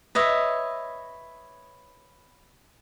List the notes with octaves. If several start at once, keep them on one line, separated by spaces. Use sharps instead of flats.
B4 C#5 D#5 E5